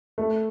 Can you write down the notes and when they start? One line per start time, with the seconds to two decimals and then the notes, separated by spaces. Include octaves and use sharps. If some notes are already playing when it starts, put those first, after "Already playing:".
0.18 A3